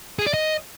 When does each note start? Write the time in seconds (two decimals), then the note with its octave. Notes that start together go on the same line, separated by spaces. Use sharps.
0.19 G#4
0.26 D5
0.34 D#5